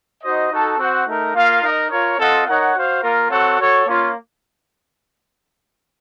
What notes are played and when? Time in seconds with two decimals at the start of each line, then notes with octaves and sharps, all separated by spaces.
0.22 D#4 F#4 C5 D#5
0.50 D#4 F#4 A4
0.78 C4 F#4 C5 F#5
1.06 A3 D#4 A#4
1.34 A#3 F4 A#4 F5
1.62 D#4 A#4 D#5
1.90 F4 A#4 C#5
2.18 C4 F4 A4 D#5 F#5
2.46 D#4 A#4 C#5 F#5
2.75 F#4 C5 F5
3.02 A#3 F4 A#4
3.30 C4 F#4 A4 C#5 F#5
3.58 F#4 A4 C#5
3.87 A#3 C#4 F4